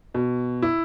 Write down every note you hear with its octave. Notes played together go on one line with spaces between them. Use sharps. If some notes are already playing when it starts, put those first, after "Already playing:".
B2
E4